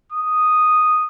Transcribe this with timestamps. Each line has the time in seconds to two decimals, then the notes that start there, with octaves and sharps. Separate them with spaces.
0.12 D#6